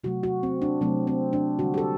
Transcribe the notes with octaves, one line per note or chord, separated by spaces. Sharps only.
C3 F#3 A3 F#4
F#4
C4
D4
C3 F#3 A3 C4
C4
D4
D3 G3 F#4
G4
A4